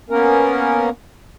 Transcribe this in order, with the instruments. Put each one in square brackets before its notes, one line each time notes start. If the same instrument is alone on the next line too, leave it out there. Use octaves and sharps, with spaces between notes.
[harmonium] A#3 B3 C#4 A#4